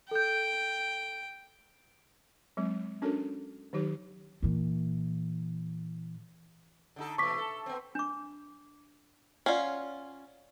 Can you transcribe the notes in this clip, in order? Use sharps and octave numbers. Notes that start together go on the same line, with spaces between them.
A4 G5 G6
F#3 G#3 C4
C#4 D4 F#4 A4 A#4 C#5
D#3 F#3 D#4 G4 C#5
A#2 E3
D3 D#4 A4
B2 E3 A3 C#6 D6 B6
A4
B3 C4
D4 D6
C#4 F4 D5 F#5